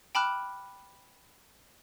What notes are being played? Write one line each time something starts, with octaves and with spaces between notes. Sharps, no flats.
G5 A5 B5 D6 F6 F#6